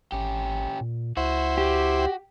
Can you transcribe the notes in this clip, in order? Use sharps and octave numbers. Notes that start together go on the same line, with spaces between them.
G#1 C#4 G4
A#2
C#2 E4 F#4 C5
F#4 G4